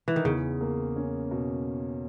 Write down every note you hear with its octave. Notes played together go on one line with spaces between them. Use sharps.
E3
D#3
E2 C#3
A#3
C#4
B2